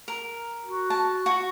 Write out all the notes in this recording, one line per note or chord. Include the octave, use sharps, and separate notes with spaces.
A#4
F#4
A5
F#4 C#6